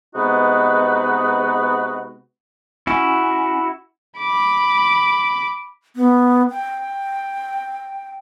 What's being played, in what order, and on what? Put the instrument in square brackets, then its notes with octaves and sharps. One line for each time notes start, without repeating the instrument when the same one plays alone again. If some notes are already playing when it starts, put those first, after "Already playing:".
[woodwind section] C3 G#3 B3 D#4 F#4 B4
[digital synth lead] C#4 [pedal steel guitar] E4 F#4
[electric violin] B5 D6
[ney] B3
G5